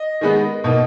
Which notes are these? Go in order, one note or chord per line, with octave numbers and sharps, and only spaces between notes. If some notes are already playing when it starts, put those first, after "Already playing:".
Already playing: D#5
D#3 G#3 B3 D#4
B2 A#3 D#4